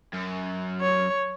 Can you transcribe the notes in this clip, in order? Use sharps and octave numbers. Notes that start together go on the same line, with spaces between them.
F#2
C#5